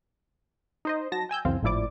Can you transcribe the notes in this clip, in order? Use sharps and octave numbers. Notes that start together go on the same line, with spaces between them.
D#4 C5 D#5
F#3 A5 A#6
G5 G#5 E6 G6
C#2 F#2 E3 C4 F5
G#1 A2 F3 E4 D5 D6